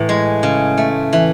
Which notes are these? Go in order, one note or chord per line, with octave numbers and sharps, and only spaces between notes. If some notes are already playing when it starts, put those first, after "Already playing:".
Already playing: A2 E3
G#3
C#3
A3
E3